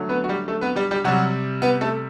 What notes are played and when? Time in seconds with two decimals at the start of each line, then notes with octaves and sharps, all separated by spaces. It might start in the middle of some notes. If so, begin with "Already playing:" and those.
Already playing: D3 F#3 A3
0.09 B3 B4
0.24 F#4
0.29 G3 G4
0.48 A3 A4
0.61 B3 B4
0.76 G3 G4
0.91 G3 G4
1.04 C3 F#3 G3 F#4
1.62 B3 B4
1.81 A3 A4